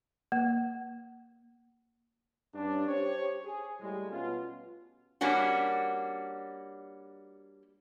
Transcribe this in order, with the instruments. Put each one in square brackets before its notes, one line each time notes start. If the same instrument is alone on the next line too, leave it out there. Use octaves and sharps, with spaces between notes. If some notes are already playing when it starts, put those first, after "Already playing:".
[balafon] A#3
[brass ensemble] G2 C#4 D4
G4 C5 C#5
G#4
A2 G3 G#3
B2 B3 C#4 F4
[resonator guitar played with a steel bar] G3 A#3 C#4 D4 F#4